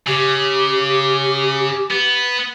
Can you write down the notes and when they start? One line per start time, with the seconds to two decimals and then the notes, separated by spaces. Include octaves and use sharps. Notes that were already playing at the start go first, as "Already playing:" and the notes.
0.07 C#3 G4
1.91 B3